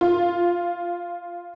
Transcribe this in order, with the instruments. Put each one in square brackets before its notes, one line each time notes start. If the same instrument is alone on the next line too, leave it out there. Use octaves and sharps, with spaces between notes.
[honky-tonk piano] F4